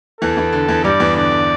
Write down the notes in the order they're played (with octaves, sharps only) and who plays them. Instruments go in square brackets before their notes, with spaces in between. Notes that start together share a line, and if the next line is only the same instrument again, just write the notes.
[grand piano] E2 E3 [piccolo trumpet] A4
[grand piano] E2 E3
D3
E2 E3
[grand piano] G2 G3 [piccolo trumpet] D5
[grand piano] E2 E3
[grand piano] D3 [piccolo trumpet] D5
[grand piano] D3